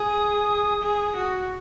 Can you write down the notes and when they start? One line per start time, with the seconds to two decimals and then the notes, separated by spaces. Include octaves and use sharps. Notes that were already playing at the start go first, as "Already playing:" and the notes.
Already playing: G#4 D#6
0.82 G#4
1.15 F#4